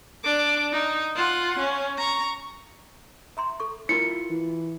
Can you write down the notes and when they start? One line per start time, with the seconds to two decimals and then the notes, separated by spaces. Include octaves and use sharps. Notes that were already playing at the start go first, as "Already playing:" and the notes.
0.24 D4 D6
0.72 D#4
1.16 F4 F#5
1.59 C#4
1.98 A#5 C#6
3.37 E5 A#5 C6
3.60 A4 C#6
3.89 E4 F4 A#4 C#7
4.30 E3